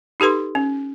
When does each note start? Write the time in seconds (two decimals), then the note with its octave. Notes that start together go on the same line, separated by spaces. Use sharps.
0.20 D#4 G4 A4 B4 C6
0.55 C#4